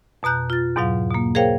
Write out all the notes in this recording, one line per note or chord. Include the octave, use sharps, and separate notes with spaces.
F2 B2 A#5 F#6 G6
F4 A6
E2 G#2 B2 F#3 F5
B2 A#3
G#4 A#4 C5 C#5 F5 G5